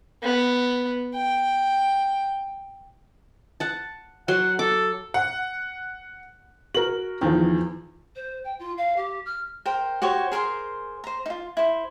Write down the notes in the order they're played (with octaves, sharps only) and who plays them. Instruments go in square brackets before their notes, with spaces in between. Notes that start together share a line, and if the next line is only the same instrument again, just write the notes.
[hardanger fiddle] B3
G5
[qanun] F#5 A5
[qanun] F#3 C6 [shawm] F#5
[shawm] A4 [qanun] D6
[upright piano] F#5
[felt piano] F#4 A#4 [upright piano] F#7
[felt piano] E2 F3 [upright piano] D#3
[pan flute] C5
G5
F4
F5
G4
F6
[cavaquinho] A#4 C5 G5
F#4 G4 C5 C#5
G#4 A#4 C5 C6
C5 A#5
D#4 F4
E4 C5